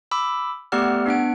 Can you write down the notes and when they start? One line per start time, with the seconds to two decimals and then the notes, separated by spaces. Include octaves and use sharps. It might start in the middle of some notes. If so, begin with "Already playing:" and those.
0.11 B5 D6 E6
0.72 A3 B3 G4 D5 F#5 F6
1.06 B3 D4 F#5 D7